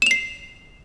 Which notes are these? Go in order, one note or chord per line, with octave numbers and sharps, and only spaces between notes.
C7 E7 F7